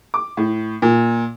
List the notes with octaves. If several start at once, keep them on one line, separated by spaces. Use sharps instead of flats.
D6
A2
A#2